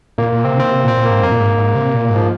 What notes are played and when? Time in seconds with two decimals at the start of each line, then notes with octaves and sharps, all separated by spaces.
0.18 A#2 A#3
0.32 A#2
0.44 C3 C4
0.57 D#3 C4
0.71 C3
0.84 A#2 C4
0.97 A#2
1.05 G#2 A#3
1.23 F2 A#3
1.32 A#2
1.40 G#2
1.58 G#2
1.75 C3
1.93 A#2
2.10 G#2
2.16 F3